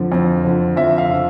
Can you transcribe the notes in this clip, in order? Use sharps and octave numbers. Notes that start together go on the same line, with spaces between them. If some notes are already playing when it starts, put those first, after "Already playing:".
Already playing: F2 D3 F3
F2
D3 F3
F2 E5
F5
D3 F3